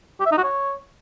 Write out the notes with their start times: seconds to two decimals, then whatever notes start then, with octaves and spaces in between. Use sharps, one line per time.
0.20 G4
0.26 E5
0.32 D#4
0.38 F#4
0.44 C#5